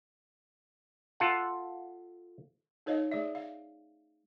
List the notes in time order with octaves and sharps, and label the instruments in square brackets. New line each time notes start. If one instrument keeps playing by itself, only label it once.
[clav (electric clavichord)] F4 A4 F#5
[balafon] D#4 A4 C5 C#5 D#5 F5
A3 G#4 D5 E5
F5